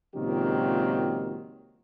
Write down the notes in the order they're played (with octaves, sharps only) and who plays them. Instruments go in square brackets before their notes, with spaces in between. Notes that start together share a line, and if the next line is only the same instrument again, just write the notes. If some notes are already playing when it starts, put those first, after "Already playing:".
[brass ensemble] C#2 A#2 D#3 F#3 C4 G4